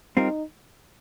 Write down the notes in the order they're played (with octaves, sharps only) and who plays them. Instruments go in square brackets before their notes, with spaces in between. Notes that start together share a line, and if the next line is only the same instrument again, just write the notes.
[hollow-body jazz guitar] G3 C4 F4 A#4 [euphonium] D#4